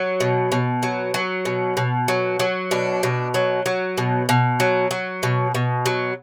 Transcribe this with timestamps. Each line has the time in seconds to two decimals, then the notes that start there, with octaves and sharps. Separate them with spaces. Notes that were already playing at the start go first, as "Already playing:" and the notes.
Already playing: F#3
0.20 B2
0.52 B2
0.83 F#3
1.14 F#3
1.45 B2
1.77 B2
2.08 F#3
2.40 F#3
2.71 B2 D4
3.03 B2
3.34 F#3
3.66 F#3
3.98 B2
4.29 B2
4.60 F#3
4.91 F#3
5.23 B2
5.54 B2
5.86 F#3